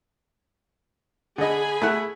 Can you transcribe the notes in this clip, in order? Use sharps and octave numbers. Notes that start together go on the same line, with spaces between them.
D3 G#4 D#5 G#5 B5
A3 E4 F#5